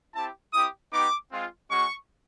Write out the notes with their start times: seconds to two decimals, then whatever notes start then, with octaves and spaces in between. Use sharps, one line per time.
0.15 C4 E4 G4 A5
0.53 C4 E4 G4 D#6
0.93 B3 D#4 G4 D6
1.32 G#3 C4 F4
1.70 G#3 C#4 F#4 C#6